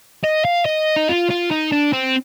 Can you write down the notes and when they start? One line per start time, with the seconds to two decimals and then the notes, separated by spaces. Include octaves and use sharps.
0.24 D#5
0.45 F5
0.66 D#5
0.96 D#4
1.09 F4
1.30 F4
1.51 D#4
1.72 D4
1.93 C4